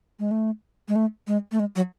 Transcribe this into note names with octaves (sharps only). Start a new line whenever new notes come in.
G#3
A3
G#3
A3
G#3
A3
G#3
F#3